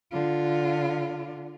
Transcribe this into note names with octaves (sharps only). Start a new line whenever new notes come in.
D3 F4